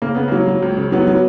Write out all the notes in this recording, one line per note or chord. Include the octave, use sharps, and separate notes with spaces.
C#3 A#3
C#3 B3
F#3 A#3
F#3
C#2
C#3
F#3 B3
F#3